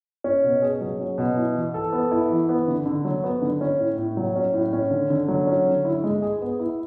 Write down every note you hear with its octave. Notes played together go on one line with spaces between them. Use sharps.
C#4
B2
G#4
F#3
C#4
B2
E4
E3
A4
B3
E4
E3
B3
D3
D3
F#3
B3
D3
C#4
A2
A2
F#3
C#4
A2
C#4
D3
D3
F#3
C#4
D3
E4
G#3
G#4
B3
E4